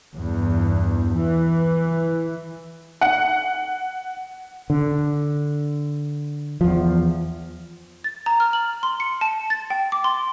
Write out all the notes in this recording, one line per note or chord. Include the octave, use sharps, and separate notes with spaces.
E2 G2
E3
F#5
D3
E2 F3
A6
A#5
F6
F#7
C6
C#7
A5
A6
G5
D6
C6